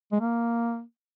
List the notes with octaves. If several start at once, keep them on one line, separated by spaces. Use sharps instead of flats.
G#3
A#3